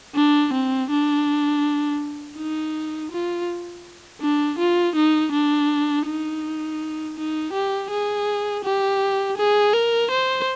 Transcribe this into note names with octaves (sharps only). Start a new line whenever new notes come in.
D4
C4
D4
D#4
F4
D4
F4
D#4
D4
D#4
D#4
G4
G#4
G4
G#4
A#4
C5